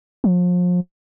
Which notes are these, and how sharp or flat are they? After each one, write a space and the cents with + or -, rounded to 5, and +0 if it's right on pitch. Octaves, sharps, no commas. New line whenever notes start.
F3 +35